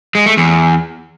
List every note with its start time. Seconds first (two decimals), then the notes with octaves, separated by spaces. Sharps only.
0.15 G#3
0.26 A3
0.37 E2